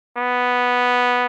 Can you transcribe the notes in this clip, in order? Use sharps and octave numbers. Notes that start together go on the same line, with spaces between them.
B3